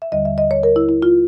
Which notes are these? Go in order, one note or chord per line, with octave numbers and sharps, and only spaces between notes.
E5
D#2 D3 G3 D#5
E5
D#5
C#5
A#4
E4
E4
F4